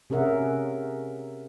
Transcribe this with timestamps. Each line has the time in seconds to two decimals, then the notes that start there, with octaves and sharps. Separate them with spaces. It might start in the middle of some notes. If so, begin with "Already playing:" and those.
0.10 C3 C#4 G#4 A#4 E5 F#5